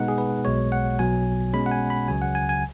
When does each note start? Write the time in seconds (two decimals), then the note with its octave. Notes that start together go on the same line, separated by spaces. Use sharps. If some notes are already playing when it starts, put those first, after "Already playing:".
Already playing: B2 G#3 B3 D#4 F#5
0.08 G#4
0.18 B4
0.45 B1 B2 G#3 C#5
0.72 F#5
0.99 B1 B2 F#3 G#5
1.53 B2 G#3 C#4 B5
1.66 F#5
1.71 G#5
1.90 B5
2.08 C#2 C#3 F#3 G#5
2.22 F#5
2.35 G#5
2.49 G#5